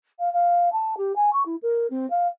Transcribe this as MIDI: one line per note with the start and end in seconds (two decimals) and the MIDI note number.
0.19 0.32 77
0.33 0.72 77
0.73 0.95 81
0.97 1.15 67
1.16 1.33 80
1.33 1.43 85
1.46 1.56 64
1.63 1.87 70
1.90 2.09 60
2.10 2.28 77